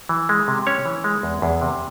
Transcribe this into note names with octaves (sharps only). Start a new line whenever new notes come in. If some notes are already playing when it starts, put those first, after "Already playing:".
E3
G#3
C3
C#4 C#5
E3
G#3
E2
E2
C3